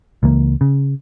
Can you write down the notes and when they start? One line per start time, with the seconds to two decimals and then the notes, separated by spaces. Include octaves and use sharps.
0.23 C#2 E3 A#3
0.61 C#3